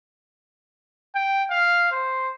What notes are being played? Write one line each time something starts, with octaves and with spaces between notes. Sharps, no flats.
G5
F5
C5